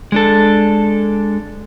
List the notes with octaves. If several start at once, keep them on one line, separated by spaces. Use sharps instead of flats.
G#3 D4 A4